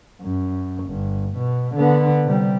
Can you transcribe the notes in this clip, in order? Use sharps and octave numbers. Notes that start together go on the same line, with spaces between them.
F#2
G1
B2
D3 B3
C3 G3